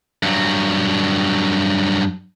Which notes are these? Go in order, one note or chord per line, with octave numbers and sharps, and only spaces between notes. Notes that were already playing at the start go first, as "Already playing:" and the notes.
G2 F#3